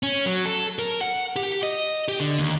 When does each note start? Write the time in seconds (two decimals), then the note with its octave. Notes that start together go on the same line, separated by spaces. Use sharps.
0.03 C#4
0.26 F#3
0.45 A4
0.79 A#4
1.01 F#5
1.36 G4
1.63 D#5
2.08 G4
2.20 D3
2.39 D#2